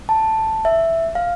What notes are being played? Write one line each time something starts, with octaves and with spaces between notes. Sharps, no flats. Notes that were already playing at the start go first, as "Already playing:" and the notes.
A5
E5
F5